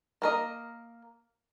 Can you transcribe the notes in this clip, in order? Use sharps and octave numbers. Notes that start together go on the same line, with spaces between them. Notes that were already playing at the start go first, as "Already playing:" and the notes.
A#3 A#4 D#5